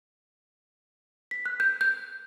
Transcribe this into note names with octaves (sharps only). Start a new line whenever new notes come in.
B6
F#6
G6
G6